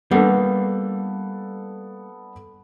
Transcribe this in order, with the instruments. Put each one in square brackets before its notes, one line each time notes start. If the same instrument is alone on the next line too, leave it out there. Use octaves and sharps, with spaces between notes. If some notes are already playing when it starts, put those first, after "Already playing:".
[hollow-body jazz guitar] G3 A#3 [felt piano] B3 D4 A4